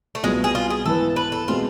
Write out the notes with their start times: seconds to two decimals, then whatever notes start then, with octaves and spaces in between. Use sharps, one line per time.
0.15 A3
0.23 C2 B2 G#3 B3 F4
0.44 G#4
0.55 F4
0.70 G#4
0.86 G#2 E3 B3 E4 A4 B4
1.16 B4
1.32 A4
1.48 B2 G#3 C4 F4